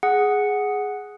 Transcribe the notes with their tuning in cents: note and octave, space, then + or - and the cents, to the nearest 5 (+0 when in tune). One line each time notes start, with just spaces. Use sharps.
G#4 +0 F#5 +0